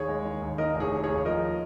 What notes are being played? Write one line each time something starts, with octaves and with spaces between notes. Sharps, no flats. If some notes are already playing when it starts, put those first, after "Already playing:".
Already playing: D#2 G#4 C#5
G#3
D#3
D#2
D#3 A#4 D#5
F1
G#4 C#5
D#3
D#2 G#4 C#5
F3 A#4 D#5